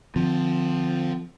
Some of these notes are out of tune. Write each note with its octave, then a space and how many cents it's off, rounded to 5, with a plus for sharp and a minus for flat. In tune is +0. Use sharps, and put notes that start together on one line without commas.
D3 +25 F3 +0 C4 -25